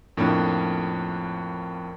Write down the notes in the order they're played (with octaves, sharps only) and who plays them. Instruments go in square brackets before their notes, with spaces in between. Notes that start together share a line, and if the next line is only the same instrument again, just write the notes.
[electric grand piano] F2 A2 A#3 C#4 D4